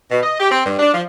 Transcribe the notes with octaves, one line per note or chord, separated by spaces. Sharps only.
B2
D#5
G4
C4
G2
D4
F3